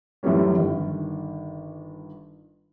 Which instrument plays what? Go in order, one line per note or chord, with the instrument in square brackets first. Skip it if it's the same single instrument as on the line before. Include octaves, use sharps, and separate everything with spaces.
[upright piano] F#2 A2 D#3 E3 G3 C#4
G1 D#3